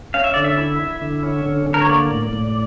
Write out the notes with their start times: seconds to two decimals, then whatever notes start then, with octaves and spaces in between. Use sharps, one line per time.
0.14 C#4 F5
0.24 E5
0.34 D3 D5
0.44 E5
0.58 E4
0.80 E4
1.02 D3
1.23 C#4
1.45 D3
1.67 D3
1.74 A#4
1.81 C#5
1.89 A#3 D5
2.11 A2
2.33 A2